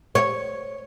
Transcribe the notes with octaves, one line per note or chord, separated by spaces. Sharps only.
C#5